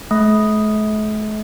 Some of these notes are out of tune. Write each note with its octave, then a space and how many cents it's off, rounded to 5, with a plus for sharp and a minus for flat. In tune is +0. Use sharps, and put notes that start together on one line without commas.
A3 -45